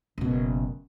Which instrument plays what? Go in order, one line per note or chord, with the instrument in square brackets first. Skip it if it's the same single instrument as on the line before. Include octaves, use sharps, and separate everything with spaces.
[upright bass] F#1 B2